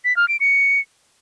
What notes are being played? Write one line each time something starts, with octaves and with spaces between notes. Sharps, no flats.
B6
F6
D7
C#7